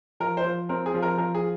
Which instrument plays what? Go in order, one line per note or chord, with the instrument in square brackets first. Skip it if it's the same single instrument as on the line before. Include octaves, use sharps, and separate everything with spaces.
[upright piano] F3 [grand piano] A#4
[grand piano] C5
[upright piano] F3
[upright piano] C4 [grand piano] A#4
[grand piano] G#4
[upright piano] F3
[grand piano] A#4
[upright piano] F3 [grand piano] A#4
[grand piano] G#4